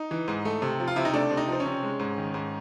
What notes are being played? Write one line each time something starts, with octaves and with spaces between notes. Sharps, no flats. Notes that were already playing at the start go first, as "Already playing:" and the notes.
Already playing: D#4
E3
G#2
A3
C3
F3
F4
C3 E4
D#4
A3 D4
C3
D#4
F3 C4
C#4
C3
G#3
G#2
D#3
G#2